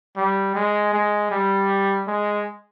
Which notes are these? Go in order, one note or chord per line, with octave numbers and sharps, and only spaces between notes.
G3
G#3
G#3
G3
G#3